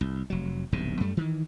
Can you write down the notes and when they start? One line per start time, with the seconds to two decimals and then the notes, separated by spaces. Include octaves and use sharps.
0.01 C2
0.30 F1 F#3
0.72 D#1 B1 G2 C3
1.00 F#2 G3 A3
1.17 D#3 E3